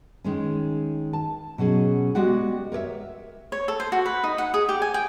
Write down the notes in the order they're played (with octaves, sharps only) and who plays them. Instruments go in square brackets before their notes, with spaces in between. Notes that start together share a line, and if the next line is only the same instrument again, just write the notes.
[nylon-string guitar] D#3 G#3 C#4
A5
B2 F#3 C#4 G#4
G#3 B3 F#4 G4 D5 F#5
A#4 C#5 D5 E5
[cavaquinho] C#5
A4
C5
F#4
B4
D#4
F#5
G#4
G4
G#5
G5